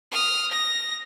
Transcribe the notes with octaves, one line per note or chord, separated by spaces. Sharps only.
D#6 F6
A#6